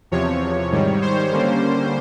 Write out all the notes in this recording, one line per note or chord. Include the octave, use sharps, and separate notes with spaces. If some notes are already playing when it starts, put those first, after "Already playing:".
E2 C3 F3 C#5
G#2 D#3 G3
C5
D3 G3 A#3 C#4